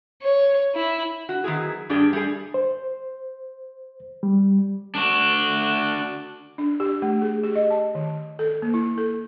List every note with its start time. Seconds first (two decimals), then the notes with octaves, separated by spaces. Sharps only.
0.22 C#5
0.75 E4
1.29 F#4
1.44 D#3 F#3 B3 E4 G#4
1.89 G2 D4 G4 G#4 D5
2.13 G3 A3 G#4
2.54 C5
4.23 G3
4.95 D4 F#4
6.58 D4
6.80 G4
7.02 A3
7.22 G#4
7.43 G4
7.55 D#5
7.70 A5
7.95 D#3
8.39 A4
8.62 A#3
8.74 E4
8.98 A4